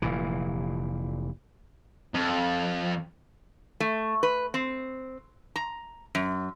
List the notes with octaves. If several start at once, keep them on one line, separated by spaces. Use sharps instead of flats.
F1 A#2 E3
F2
A3
B4
C4
A#5
F#2